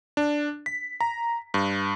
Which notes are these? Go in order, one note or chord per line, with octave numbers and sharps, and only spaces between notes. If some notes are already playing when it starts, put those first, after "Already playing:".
D4
B6
A#5
G2